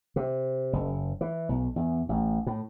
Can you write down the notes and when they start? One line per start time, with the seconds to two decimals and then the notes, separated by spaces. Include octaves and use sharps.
0.16 C3
0.73 F#1
1.21 E3
1.49 B1
1.76 E2
2.09 A1
2.46 A2